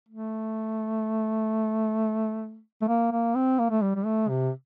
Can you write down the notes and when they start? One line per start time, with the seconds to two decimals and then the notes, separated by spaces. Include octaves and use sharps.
0.09 A3
2.81 A3
2.88 A#3
3.12 A#3
3.35 C4
3.59 A#3
3.70 A3
3.82 G3
3.95 G3
4.05 A3
4.29 C3